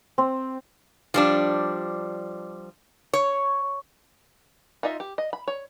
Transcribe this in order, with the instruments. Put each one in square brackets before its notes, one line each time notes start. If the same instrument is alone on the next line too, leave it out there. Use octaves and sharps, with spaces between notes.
[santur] C4
[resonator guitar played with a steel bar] F3 G3 D4
C#5
[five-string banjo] D#4 F4 D#5 E5
G4
D#5
B5
C#5